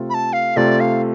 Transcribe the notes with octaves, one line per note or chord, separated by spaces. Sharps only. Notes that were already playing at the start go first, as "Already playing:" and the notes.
Already playing: C3 A3 F4 A4
B5
A5
F5
C3 A3 F4 A4 D5
F5